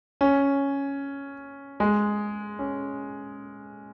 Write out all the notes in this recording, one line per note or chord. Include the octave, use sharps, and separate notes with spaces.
C#4
G#3
C#4